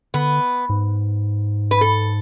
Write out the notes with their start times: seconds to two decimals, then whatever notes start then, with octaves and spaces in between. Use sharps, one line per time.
0.14 D3 B3
0.69 G#2
1.71 B4
1.81 A4